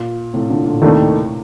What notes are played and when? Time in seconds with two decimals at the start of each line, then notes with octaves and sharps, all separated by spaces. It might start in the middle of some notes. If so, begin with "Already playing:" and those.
Already playing: A#2
0.34 A2 C3
0.50 A#2 D3
0.66 A#2 D3
0.81 D#2 A2 C3 D#3 A3 D4